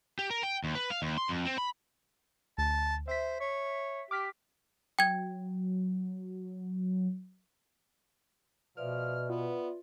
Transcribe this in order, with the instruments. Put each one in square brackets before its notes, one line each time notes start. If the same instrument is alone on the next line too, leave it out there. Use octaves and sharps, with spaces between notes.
[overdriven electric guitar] G4
A#4
G5
D#2
B4
F5
D#2
C6
F2
C4
B5
[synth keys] D2 [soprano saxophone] A5
[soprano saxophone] C5 [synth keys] E5 B6
[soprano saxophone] C#5
[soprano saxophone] G4 [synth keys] D6 F6 B6
[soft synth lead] F#3 [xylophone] G5 G#6
[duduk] B2 [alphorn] F3 [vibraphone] B4 D5 E5 [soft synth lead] F6
[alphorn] B3 [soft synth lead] F4